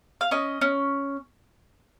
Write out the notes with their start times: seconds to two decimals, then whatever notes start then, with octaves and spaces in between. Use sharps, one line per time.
0.21 F5
0.31 C#4 D#5
0.61 C#4